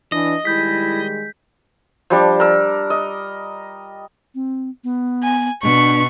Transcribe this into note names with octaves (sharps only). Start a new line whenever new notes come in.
E3 D4 D#5
D#3 G3 G#3 E4 G6 B6
F3 G3 D4
A#4 E6
D#5
C4
B3
G#5
B2 D4 C#6